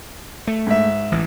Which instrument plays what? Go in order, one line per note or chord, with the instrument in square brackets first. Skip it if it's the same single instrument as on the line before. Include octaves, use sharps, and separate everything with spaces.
[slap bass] A3
[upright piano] G#2 E5
[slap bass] A1 E3